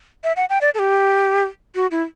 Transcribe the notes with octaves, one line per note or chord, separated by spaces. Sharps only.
E5
F#5
G5
D5
A4
G4
F#4
E4